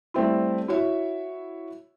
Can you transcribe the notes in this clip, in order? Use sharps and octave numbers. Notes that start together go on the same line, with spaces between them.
G3 A3 C4 E4
E4 F#4 C#5 E5